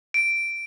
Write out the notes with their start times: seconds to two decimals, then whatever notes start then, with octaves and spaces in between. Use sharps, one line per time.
0.14 D7